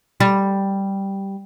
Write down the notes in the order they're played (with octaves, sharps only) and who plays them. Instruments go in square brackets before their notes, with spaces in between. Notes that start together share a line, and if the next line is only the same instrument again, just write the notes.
[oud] G3